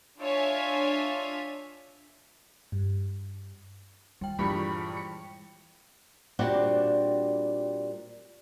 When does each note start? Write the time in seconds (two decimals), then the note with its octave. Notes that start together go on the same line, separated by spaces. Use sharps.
0.20 D4 F4 C#5 E5 G#5
2.72 G2
4.21 D#2 G3 G5
4.39 G2 A#2 E3 F3 G#3 B5 C#6
4.97 C#7
6.39 A#2 G3 C4 D4 F#4 F#5